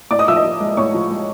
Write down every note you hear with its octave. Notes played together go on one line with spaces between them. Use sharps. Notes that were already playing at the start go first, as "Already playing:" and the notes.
A2 D5 D6
D#5 D#6
F3 E5 E6
D#5 D#6
F3
G#3
A2 C#5 C#6
F3
G#3